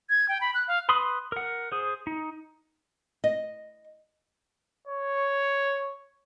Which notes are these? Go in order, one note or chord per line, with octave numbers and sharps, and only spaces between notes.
G#6
G5
B5
F#6
F5
B4 B5 C6 D#6
A#4 F#5
G#4 C5
D#4
D#5
C#5